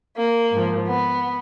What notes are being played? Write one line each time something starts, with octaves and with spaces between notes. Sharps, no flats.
A#3
G#2 F3
B3